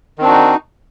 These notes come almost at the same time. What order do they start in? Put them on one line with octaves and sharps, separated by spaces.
D#3 C4 D4 F#4 D#4